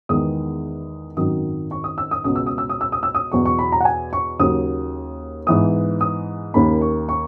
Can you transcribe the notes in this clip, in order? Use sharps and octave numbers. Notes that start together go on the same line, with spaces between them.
E2 D#3 G#3 B3 D#6
G#1 F#2 D#3 F#3 D#6
C#6
D#6
E6
D#6
C#2 B2 G#3 B3 D#6
E6
D#6
E6
D#6
E6
D#6
E6
D#6
E2 B2 F#3 C#6
C#6
B5
A#5
F#5
G#5
C#6
D#2 C#3 F#3 D#6
G#2 E3 B3 D#6
D#6
D#2 D#3 A#3 C#4 B5
C#6
C#6